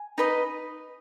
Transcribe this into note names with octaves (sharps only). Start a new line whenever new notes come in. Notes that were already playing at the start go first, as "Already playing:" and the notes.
Already playing: G#5
D#4 B4 D#5